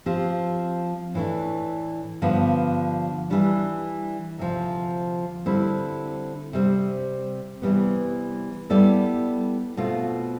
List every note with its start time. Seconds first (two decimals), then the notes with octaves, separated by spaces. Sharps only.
0.06 F3 C4 G4
1.14 A2 E3 A3 D4
2.22 G2 D3 F3 B3
3.30 E3 G3 D4
4.38 D2 C3 F3
5.46 D3 G3 C4 E4
6.53 C3 G3 C4
7.62 C3 E3 G3 B3
8.70 G3 B3 E4 A4 D5
9.77 B2 A3 C4 F4